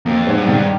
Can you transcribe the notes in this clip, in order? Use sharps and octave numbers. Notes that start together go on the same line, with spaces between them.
F2 A#3
G#2
G2
D#3